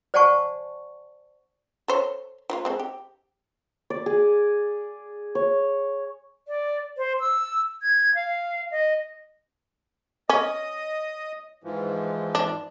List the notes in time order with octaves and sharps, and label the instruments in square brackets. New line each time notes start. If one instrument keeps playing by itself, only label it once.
[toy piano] C5 D5 F#5 G#5 A5 C#6
[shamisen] A4 C5 C#5
F3 A#3 F4
G#3 C4 A4
G4
[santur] D5
G#4
C#5
[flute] D5
C5
E6
G#6
F5
D#5
[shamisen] C#4 [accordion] D#5 D#6
[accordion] G#2 E3 F3
[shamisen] D4